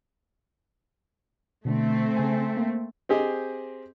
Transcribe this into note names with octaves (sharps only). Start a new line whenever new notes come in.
B2 D3 A3 C4
C#3 G#5
A#3
C4 G4 G#4 C5 D#5